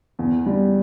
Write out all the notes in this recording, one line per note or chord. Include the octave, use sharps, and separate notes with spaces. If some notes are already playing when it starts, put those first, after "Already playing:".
E2
G3